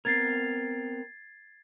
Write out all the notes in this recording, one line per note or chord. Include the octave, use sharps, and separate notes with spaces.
B3 C4 A#4 G#6 A6 C7